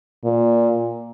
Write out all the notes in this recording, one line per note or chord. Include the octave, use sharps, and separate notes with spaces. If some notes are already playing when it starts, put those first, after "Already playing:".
A#2